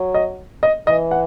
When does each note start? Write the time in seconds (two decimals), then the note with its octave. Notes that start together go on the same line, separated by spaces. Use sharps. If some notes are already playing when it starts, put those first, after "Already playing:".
Already playing: F#3
0.14 D#5
0.63 D#5
0.87 E3 D#5
1.11 F#5